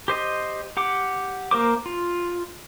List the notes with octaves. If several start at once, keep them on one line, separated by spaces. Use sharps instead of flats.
G4 C5 D#5
G4 F#5 D6
A#3 A#4 C5 D6
F4